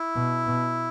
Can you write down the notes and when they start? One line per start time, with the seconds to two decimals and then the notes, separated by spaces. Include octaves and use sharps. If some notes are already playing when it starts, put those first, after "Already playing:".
Already playing: E4
0.16 B2
0.47 B2